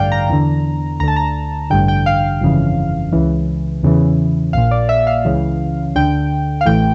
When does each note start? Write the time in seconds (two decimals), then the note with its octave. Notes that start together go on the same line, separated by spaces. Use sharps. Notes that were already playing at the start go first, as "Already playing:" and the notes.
Already playing: A1 G2 D3 D5 F5 G5
0.12 A#5
0.29 E2 D3
1.00 D2 A#5
1.03 D3 A5
1.16 A#5
1.70 A1 G2 D3 G5
1.88 G5
2.06 F5
2.41 G1 F2 C#3 E3
3.12 C#2 C#3 E3
3.83 E2 C#3 E3
4.53 A#1 A#2 F5
4.71 D5
4.89 E5
5.07 F5
5.25 C#2 C#3 E3
5.96 D2 D3 G5
6.61 F5
6.66 A1 A2 E3 G5